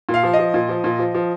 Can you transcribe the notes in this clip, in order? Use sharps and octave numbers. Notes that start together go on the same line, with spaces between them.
A#2
F5
F3
D#5
F3
A#2
F3
A#2
F3
F3